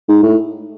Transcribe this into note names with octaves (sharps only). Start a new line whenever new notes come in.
G#2
A2